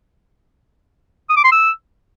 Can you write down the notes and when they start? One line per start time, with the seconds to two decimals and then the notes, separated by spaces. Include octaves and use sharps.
1.29 D#6
1.37 D6
1.44 C6
1.52 E6